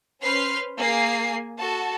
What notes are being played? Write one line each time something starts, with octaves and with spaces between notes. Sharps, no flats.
C#4 B4 C5 C6 F6 C7
A#3 G#4 G#5 C7
F#4 A4 A5